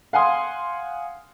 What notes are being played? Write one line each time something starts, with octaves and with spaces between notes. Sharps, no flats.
F5 F#5 G#5 C6 D#6